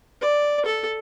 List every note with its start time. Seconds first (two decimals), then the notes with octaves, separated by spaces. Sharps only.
0.21 D5
0.65 A4